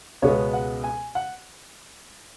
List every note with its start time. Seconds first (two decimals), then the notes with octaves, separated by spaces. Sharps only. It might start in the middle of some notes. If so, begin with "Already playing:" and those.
0.22 C#2 B2 G#3 B3 C#5
0.53 F#5
0.84 G#5
1.15 F#5